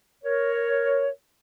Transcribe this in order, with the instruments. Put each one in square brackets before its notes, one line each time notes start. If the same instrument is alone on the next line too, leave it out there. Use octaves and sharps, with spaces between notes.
[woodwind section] A#4 C#5